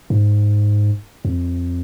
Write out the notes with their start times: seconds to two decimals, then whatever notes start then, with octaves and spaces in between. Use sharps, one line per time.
0.10 G#2
1.25 F2